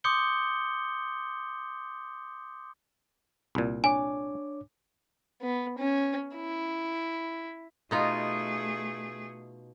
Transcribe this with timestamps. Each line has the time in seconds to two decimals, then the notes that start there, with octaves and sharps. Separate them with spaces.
0.04 C6 D6 D#6 G6 C#7 G7
3.55 C2 A#2
3.84 D4 C#5 G#5 D6
5.42 B3
5.78 C#4
6.35 E4
7.91 B2 A3 D#4 F4 G#4